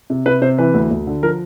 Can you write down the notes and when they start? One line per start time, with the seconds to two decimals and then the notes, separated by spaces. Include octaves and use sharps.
0.10 C3
0.26 C3 B4
0.42 C3 C5
0.58 E3 B4
0.74 D2
0.91 D2
1.07 D3
1.23 F3 A#4